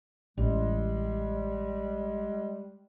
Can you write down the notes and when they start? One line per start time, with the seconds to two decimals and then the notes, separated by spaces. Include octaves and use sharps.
0.38 A1 G3 G#3